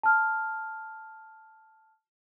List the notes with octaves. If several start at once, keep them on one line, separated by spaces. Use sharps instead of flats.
A5 F6